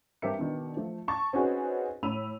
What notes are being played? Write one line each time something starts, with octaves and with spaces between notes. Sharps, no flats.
G2 C4 G4 A#4 E5 C#7
B2 D#3 D4
F3 A3
A5 C#6 A6
C4 C#4 D#4 F#4 G#4 B4
A2 B5 E6 D#7 F7